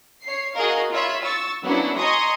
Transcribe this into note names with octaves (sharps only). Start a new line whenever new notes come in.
C#5 C7
F#4 G#4 A#4 D#5 F5
F4 C#5 E5 B5
C#6 E6 A6
F#3 A#3 B3 C#4 D4 E4
D#5 G#5 A#5 C6 C#6 D#6